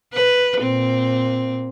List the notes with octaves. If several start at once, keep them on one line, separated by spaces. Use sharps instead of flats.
B4
A#2 C4